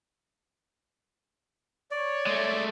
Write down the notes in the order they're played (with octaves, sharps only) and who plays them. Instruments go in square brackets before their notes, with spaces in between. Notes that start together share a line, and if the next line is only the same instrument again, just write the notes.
[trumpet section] C#5 [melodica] D5
[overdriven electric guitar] G#3 A3